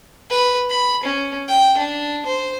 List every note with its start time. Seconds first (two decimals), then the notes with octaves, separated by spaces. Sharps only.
0.30 B4
0.70 B5
1.03 C#4
1.48 G5
1.78 D4
2.26 C5